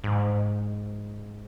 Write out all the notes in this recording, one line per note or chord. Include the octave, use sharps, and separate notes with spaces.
G#2